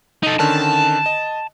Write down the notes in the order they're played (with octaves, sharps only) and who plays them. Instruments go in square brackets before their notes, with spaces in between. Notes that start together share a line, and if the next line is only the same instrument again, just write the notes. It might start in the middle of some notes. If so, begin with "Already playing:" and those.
[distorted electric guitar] D#4 A4
[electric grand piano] D3 D#3 C#4 [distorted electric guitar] A5
[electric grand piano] D#5